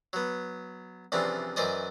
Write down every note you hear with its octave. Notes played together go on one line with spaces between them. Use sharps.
F#3 B3
C2 C#3 E3 F3 C4 D4
F#2 E3 C5 D5 D#5